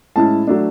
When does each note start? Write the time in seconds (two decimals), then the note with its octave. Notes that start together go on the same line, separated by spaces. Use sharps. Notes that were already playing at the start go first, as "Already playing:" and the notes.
0.16 A2 G#3 C#4 E4 A5
0.47 F#3 A3 D4